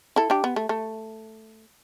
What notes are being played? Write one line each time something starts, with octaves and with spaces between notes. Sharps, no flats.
E4 A4
D4 G4
B3
A3
A3